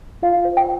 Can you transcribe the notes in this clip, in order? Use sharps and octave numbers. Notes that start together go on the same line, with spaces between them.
F4 F5
C5
G5